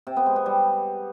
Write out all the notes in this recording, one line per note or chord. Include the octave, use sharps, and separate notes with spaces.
C3
B3
G#3
B3
G3